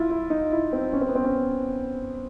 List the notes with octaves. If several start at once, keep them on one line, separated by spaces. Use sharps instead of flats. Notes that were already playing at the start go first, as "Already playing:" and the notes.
Already playing: E4 F4
E4
D#4
E4
C4
C#4
C4
B3
C4
C#4